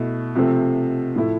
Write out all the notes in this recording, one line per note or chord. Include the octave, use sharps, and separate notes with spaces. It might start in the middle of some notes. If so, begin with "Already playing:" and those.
Already playing: B2 A3 E4
C3 F3 A3 C4
A2 F3 A3 E4